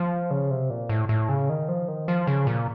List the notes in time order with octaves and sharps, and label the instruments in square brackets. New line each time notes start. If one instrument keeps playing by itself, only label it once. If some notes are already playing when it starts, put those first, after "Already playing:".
Already playing: [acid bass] F3
C#3
C3
A#2
A2
A2
C#3
D#3
F3
D#3
F3
C#3
A#2